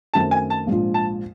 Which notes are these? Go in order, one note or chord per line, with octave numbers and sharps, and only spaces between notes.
F#2 D#3 F#3 A3 C4 A5
G#5
A5
A#1 G#2 F3
A5